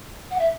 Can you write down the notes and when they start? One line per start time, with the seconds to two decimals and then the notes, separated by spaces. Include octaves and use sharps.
0.30 F#5
0.38 E5